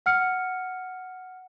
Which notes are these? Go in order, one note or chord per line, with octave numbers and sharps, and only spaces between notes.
F#5 F6 C#7